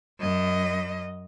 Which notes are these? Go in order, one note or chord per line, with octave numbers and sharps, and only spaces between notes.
F#2 D#5